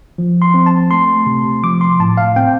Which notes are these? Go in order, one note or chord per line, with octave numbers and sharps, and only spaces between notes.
F3
C6
C4
A5
A3 C6
C3
F3 D6
C6
A2 A5
F5
C4 G5